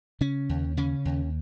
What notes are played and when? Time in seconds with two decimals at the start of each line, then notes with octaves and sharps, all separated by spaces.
0.21 C#3 C#4
0.49 D#2
0.77 C#3 C#4
1.05 D#2